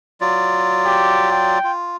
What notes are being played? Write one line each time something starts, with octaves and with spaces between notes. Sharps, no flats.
F#3 F4 D5
G4
G5
F4